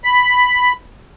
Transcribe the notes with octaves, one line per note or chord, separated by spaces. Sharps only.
B5